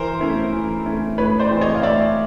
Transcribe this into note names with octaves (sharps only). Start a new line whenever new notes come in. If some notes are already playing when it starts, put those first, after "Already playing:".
Already playing: E3 A#4 C5
A3 C#4 E4
E3
A3 C#4 E4
A2 B4 C#5
C5 D5
E3 G#3 C4
C#5 D#5
F5
A2 D5 E5